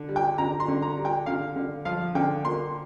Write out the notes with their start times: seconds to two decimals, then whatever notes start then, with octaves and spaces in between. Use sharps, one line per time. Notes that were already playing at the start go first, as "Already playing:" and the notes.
Already playing: D3
0.09 G3
0.16 G5
0.38 D3 A#5
0.60 C6
0.68 D3
0.82 A#5
0.97 G3
1.05 G5
1.26 D3 F5
1.56 D3
1.85 F3 F5
2.15 D3 G5
2.44 A#3 C6